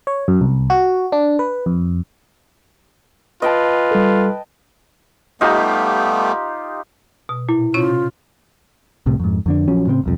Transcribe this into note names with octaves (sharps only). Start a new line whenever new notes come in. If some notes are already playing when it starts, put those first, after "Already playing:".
C#5
F#2
C2
F#4
D4
B4
F2
F4 B4 D#5 G5 A5
G3 A4
G3 A3 B3 D#4 F4 G4
B2
A#2 E4
C3 C#4 F4 C#5
C2 A2 C3
F2 G#2
F2 D3 D4
A#1 F3 F#3 C#4
A2 C#3 B3 C4
E1 C2 F2